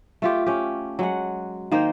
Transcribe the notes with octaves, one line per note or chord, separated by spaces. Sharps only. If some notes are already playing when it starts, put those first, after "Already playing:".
A3 F4 G4
C#4 G4
F#3 G#3 F#5
D#3 A#3 D#4 C5